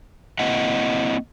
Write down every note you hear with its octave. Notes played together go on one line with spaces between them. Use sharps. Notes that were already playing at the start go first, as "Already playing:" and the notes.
A#3 C4 E4 D#5 F#5